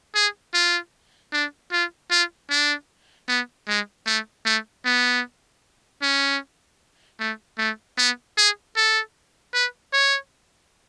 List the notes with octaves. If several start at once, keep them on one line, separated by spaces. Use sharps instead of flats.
G#4
F4
D4
F4
F4
D4
B3
G#3
A3
A3
B3
C#4
A3
A3
B3
G#4
A4
B4
C#5